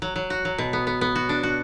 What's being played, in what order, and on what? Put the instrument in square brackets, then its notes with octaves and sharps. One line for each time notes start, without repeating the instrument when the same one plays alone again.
[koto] F#3
F#3
F#4
F#3
B2
B3
B3
B3
F#4
D4
F#4